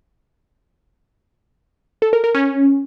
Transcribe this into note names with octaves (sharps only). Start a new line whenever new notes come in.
A4
A#4
A#4
C#4